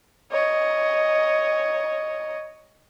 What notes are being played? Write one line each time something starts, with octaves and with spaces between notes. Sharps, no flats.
C#5 D#5